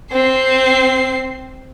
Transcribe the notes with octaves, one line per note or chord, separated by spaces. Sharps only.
C4 C7